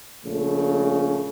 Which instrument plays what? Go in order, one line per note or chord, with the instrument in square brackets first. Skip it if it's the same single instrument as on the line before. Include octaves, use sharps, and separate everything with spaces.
[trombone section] A#1 C#3 A3